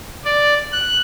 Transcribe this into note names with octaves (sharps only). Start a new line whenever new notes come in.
D5
F#6